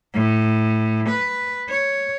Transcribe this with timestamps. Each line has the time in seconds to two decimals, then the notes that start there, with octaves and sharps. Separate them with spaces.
0.14 A2
1.09 B4
1.69 C#5